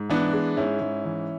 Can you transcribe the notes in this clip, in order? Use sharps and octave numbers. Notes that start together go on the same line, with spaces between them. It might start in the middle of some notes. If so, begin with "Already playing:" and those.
Already playing: G#2
E3 B3 D4
G#3
G#2 C#4 E4
G#2
E3